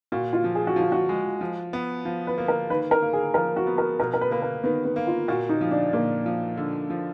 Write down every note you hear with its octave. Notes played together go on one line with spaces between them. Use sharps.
A#2 F#4
F4
F3
G#4
F#4
F3 F4
F#4
G#3
F3
B3
F3
B4
A#3
A#4
D#3 B4
A#4
A#3
G#4
F3 A#4
F#4
B3
A#4
B2 A#4
A#4
B4
A#3 B4
A#4
D#3 B3
B3
A#3
F4
A#2 F#4
D#4
F3
D4
A#2 A#3
F3
D3
F3